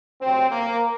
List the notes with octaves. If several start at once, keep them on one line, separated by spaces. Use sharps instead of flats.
D2 C3 F#3 C4
A#3